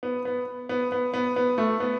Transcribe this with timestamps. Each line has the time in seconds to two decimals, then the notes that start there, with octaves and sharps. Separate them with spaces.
0.03 B3
0.25 B3
0.69 B3
0.92 B3
1.14 B3
1.36 B3
1.58 A3
1.80 B3